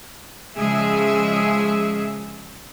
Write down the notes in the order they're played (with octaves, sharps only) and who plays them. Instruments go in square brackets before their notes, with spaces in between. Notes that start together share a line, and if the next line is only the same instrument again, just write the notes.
[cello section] C#3 F3 G#3 G#4 E5